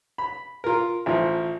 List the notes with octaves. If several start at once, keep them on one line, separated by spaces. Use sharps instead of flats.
B5
F4 A#4
A1 F3